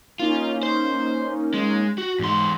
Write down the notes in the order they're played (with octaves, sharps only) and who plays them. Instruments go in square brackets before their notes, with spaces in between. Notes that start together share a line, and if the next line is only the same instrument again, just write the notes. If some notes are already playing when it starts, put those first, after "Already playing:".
[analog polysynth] A#3 C#4 D#4 [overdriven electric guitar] F4
[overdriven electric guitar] C5
G#3
F#4
[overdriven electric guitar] E2 C6 [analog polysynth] G#2